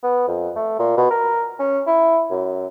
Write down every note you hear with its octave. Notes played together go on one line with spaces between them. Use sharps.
B3
F2
A3
A#2
B2
A#4
C#4
E4
F#2